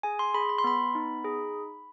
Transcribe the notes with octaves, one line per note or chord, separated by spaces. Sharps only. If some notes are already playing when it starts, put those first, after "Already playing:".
G#4 G#5
C6
G#4 B5
B5
C6
B3 B5
D#4
G#4